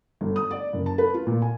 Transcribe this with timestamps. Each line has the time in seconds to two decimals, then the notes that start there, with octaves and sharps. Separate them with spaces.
0.21 G1
0.36 D#6
0.51 D5
0.73 F#1
0.86 A5
0.98 B4
1.14 F4
1.27 A#2
1.42 G#5